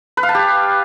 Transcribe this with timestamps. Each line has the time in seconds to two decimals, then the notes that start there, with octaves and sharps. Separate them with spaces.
0.17 B4
0.23 F5
0.29 A5
0.35 G4